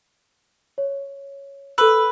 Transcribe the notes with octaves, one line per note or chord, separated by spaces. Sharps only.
C#5
A4 B4 E6